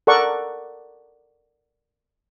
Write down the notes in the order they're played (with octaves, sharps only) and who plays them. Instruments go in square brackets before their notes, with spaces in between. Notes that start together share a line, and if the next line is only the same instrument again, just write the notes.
[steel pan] A4 A#4 D5 F#5 C#6